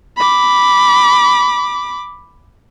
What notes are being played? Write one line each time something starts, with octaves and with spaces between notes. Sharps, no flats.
B5 D6